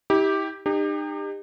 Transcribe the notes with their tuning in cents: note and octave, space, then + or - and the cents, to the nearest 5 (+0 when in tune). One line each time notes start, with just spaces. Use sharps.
E4 -45 G4 +0
D#4 -35 G4 +30